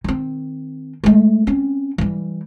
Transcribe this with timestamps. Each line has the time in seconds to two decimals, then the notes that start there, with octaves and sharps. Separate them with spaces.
0.04 D#3 C4
1.04 G#3 A3
1.47 C4 C#4
1.98 E3 G3